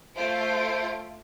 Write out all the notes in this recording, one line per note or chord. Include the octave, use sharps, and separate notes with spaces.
A3 F4 C5 D7